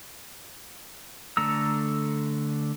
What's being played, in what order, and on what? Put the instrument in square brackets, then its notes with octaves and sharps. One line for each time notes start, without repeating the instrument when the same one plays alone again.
[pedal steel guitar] D3 A3 A#5 E6